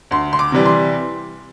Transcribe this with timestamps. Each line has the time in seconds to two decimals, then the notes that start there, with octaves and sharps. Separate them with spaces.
0.11 D2 C6
0.33 C6
0.39 D6
0.52 C3 E3 G3
0.66 C6